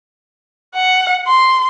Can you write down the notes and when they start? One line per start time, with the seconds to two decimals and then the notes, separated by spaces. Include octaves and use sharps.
0.75 F#5
1.27 C6